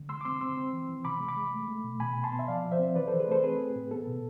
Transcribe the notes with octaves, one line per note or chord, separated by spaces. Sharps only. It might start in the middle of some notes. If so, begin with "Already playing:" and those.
Already playing: D3
G#3 C6 E6
D6
C4 C6 E6
C4 C6 E6
C4
E3
E3
C3 B5 D6
G#3
B5 D6
G#3
A3
A3
B2
B2 G#5 B5
B2
A5 C6
B3
E5
F3 D5 F5
F3
C5 E5
C4
E3 B4 D5
E3 A4 C5
G#4 B4
A3 A4 C5
C4 G#4 B4
C4
A2
B3 A4
B2